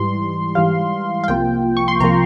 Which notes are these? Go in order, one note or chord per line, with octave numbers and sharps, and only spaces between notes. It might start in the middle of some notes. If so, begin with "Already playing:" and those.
Already playing: G#2 E3 G3 C6
G#2 E3 G3 F5
F5
C2 C3 F3 A#3 F4 G5
C#6
C6
C2 C3 F3 A#3 F4 A#5